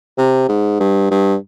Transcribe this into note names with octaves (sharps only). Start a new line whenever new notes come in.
C3
G#2
G2
G2